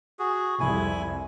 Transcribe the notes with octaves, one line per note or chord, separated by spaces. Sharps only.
F#4 G#4
C2 F2 E4 G#5